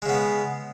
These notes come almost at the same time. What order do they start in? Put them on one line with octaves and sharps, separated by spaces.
G#3 C#3 B3